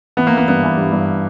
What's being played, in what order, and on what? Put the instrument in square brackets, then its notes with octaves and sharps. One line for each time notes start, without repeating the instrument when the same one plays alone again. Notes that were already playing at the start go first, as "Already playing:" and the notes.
[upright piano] E3 [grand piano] B3
[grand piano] A#3
[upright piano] E3 [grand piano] B3
[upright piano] G2 [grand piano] B3
[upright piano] E3
G2
G2